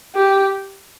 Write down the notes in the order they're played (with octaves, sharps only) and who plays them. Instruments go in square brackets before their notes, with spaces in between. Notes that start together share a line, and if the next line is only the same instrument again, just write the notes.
[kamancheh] G4